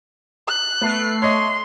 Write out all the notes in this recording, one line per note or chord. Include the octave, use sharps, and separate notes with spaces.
F#6
A3 B3 C7
C#5 D#5 C6